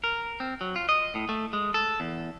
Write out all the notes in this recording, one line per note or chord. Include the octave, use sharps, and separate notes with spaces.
A#4
C4
F#3
F4
D#5
A2
A3
G#3
A4
E2